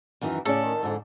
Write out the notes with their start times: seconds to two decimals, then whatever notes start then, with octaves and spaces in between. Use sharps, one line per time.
0.21 F#2 D#3 E3
0.45 A2 C#3 C#4 A4 D5
0.63 D#3
0.83 F2 G#2 D3 A4